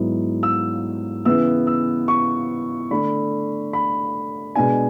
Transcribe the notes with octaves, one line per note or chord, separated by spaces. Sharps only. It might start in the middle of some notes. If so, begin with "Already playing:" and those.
Already playing: G#2 F#3 B3 E4
E6
C#3 E3 B3 E4 E6
E6
C#6
D3 A3 D4 B5
B5
B2 G#3 B3 D4 G#5